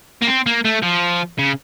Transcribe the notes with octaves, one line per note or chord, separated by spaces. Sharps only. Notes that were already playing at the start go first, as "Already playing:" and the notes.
A#3
C4
A#3
A3
F3
C#3